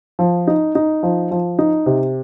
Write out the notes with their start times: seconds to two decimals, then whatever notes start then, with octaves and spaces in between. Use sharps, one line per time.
0.19 F3
0.47 D#4
0.75 D#4
1.03 F3
1.31 F3
1.59 D#4
1.86 C3